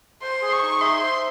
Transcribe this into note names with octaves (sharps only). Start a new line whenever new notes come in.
C5 C6
G#4
C#6
D#4
E5 C6
C5